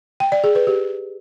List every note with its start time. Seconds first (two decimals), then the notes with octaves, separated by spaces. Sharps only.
0.20 G5
0.32 D5
0.44 G#4
0.55 B4
0.67 G4